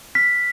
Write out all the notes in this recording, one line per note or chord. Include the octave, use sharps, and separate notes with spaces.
F6 B6